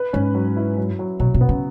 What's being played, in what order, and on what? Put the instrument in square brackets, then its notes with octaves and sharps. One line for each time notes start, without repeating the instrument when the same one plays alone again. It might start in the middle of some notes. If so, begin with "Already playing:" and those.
Already playing: [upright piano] B4
[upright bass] G#2 [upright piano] C#4
[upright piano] F#3
E4
F#3
F#3
[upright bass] B2 [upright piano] F#3
[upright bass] B2
[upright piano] B3
[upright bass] C#3